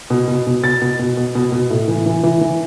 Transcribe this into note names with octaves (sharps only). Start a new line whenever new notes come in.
B2
B2
B2
B2 A6
B2
B2
B2
B2
B2
A2
E3
E3
E3
E3